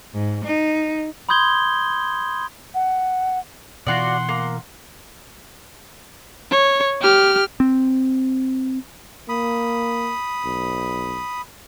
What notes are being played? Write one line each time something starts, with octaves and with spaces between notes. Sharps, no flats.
G#2
D#4
B5 C6 D#6 G6 G#6 G7
F#5
B2 E3 F4 F#4 D5 F#5 C6
A#3
C#5
G4 F6
C4
A#3 B5 D#6
B1